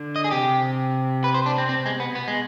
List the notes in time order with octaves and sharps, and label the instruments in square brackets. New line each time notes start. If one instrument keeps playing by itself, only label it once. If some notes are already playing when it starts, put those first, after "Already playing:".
Already playing: [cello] D3
[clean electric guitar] D#5
G#4
[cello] C3 [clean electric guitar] G4
[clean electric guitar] B4
C5
D4
C4
[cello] B2 [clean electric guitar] C4
[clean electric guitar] G#3
B3
[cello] B2 [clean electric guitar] B3
[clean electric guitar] G#3